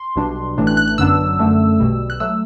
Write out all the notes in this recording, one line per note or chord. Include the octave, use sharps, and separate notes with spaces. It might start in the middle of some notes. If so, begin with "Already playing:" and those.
Already playing: C6
B1 B2 G3 D4
A1 A2 E3 A3 D4
F#6
F#6
F#6
G1 F#2 F#3 B3 D4 E6
F#2 D3 A3 D4
B1 B2 G3
F#6
F#3 A3 E6